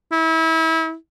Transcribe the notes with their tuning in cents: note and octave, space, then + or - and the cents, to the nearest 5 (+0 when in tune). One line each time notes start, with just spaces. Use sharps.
E4 -30